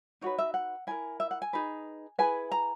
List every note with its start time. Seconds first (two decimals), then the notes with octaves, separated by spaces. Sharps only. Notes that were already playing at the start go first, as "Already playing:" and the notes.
0.21 D#4 F#4 B4 C#5
0.39 E5
0.54 F#5
0.87 E4 A#4 G#5
1.20 E5
1.31 F#5
1.42 G#5
1.53 D#4 G#4 B4
2.19 E4 G#4 B4 G#5
2.52 A#5